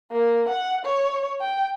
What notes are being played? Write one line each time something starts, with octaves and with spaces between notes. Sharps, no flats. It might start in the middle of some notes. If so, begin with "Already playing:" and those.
A#3
F#5
C#5
G5